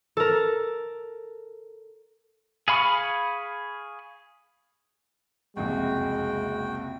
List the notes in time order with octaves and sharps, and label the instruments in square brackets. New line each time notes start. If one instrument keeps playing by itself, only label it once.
[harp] A4 A#4
[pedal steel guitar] G#4 F5 B5 C#6
[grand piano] F#1 C2 F2 [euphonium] G#3 [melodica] F#4 G5